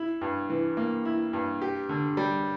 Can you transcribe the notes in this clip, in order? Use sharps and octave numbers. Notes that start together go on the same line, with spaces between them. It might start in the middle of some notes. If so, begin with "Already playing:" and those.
Already playing: E4
G2
E3
A#3
E4
G2
G4
D3
G3